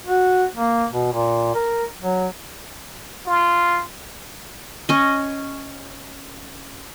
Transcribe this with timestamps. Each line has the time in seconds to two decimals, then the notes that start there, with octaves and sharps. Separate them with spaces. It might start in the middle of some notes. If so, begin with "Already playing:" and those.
0.06 F#4
0.55 A#3
0.92 B2
1.13 A#2
1.55 A#4
2.03 F#3
3.26 F4
4.89 C#4 D#5